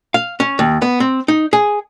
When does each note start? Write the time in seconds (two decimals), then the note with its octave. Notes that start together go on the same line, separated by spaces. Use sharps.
0.14 F5
0.40 C#4
0.59 D#2
0.82 B3
1.00 C4
1.28 D#4
1.53 G#4